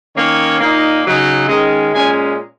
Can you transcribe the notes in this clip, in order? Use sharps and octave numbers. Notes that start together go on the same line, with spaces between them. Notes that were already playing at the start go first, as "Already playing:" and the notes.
D#3 A#3 C#4 C#5
A#2 A#3 D#4
C#3 F#3 D#4
D#3 G#3 C#4 D#5
A#2 G#3 C#4 G#5